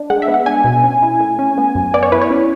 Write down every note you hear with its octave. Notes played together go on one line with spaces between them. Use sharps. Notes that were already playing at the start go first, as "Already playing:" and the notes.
Already playing: D4
G#3 F#5
E5
B3
F#5
D4 G#5
B2
C#4
E4
A3
C#4
B3
F#2
B3 D5
C#5
E4 B4
C#5
C#4